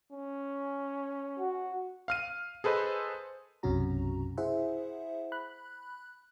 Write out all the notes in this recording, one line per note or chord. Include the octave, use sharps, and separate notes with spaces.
C#4
F#4
F5 F6 D#7
G#4 A4 B4 C5 D#5
B1 F#2 C3 C#4 F#4 A#5
E4 G#4 C5 E5 F#5
B5 F#6